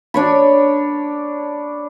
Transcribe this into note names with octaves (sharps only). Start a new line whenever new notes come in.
D4 C#5 B5